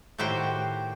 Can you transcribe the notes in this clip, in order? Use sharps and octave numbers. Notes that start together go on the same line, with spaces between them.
A2 D#3 F#4 G4 C5 G5